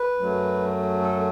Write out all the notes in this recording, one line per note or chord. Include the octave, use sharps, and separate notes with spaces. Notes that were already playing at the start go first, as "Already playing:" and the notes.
Already playing: B4
F#2 F#3 A3
A4